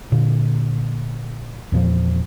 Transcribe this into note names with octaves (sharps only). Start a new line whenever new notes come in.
A#2 D3
E2 A#2 F3